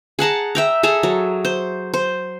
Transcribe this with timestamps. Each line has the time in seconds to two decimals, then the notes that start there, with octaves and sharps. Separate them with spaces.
0.19 G#4 F#5 A5 A#5
0.55 E5 G5 A#5
0.83 G#4 A4 E5 A#5
1.03 F#3
1.45 C5
1.94 C5